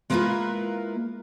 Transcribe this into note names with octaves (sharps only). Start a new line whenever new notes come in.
G#3 A#3 E4 F4 A#4 B4